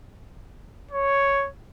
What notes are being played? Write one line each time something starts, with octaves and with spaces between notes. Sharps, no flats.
C#5